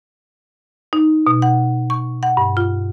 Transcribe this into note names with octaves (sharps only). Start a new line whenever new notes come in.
D#4
B2
F#5
C#6
F#5
G2
F4